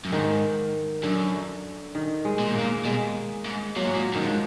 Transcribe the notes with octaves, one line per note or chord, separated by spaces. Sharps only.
F#2
G#2 D#3
F#2 D3
D#3
G#3
A#2
G#2
A#2 A#3
B2 G#3
G#2
A#2 F#3
G#2
A#2
F#2 D#3
G#2 F3